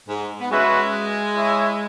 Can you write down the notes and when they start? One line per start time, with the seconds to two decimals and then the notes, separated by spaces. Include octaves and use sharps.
0.09 G#2
0.41 B3
0.51 G#3 C#4 F#4 B4 E5
1.36 E4 C#5 E5